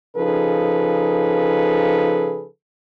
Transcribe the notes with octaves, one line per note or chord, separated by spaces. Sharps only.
C#3 F3 D#4 G#4 A4 B4